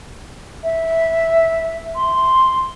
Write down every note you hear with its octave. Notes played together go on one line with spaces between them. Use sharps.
E5
C6